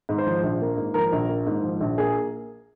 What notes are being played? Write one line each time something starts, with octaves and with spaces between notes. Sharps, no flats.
G#2
C5
F3
A#1
A#3
G#2
F3 A#4
A#1
A#3
G#2
F3
A#1
A#3 G#4